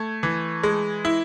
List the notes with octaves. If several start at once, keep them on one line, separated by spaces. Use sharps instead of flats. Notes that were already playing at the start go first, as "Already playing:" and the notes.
Already playing: A3 G#6
E3
G#3
E4